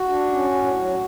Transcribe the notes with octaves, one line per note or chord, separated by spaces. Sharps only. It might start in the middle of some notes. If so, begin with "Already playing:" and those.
Already playing: F#4
D4
C#4
A2
F#3